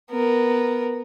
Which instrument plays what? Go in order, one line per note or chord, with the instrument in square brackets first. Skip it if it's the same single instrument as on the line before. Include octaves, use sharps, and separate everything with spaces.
[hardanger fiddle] B3 A#4